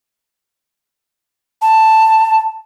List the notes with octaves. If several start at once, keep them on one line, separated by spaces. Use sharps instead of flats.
A5